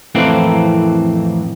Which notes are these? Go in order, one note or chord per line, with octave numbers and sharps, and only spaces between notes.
F2 A2 E3 A#3 C4